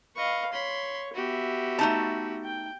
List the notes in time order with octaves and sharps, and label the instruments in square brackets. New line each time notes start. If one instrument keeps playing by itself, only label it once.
[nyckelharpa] B4 F5 [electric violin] D#5 C#6
[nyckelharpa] C#5 [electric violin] B5 C6
[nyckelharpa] B3 E5 [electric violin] F#4 G4
[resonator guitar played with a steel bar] A3 D#4 A5
[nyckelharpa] G5